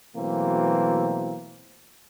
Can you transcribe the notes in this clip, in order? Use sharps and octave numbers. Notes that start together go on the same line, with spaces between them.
B2 E3 F#3 A3 A#3 C4